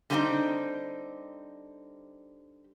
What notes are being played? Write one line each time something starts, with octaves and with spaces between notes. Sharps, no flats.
D3 G3 A3 A#3 C4 D#4